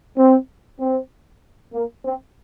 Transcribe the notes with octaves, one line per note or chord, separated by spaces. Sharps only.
C4
C4
A#3
C4